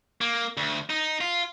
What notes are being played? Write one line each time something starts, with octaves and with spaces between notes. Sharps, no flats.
A#3
D2
D#4
F4